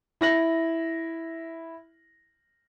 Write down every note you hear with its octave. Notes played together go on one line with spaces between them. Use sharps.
E4 A#6 F#7